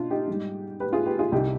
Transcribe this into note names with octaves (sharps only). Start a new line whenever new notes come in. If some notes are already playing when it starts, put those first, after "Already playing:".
Already playing: B2 D4 D#4 F4
D#4 G4
G#2 G3
G4 B4
F4 G#4
G4 B4
F4 G#4
C2 C3 G3 D#4 G4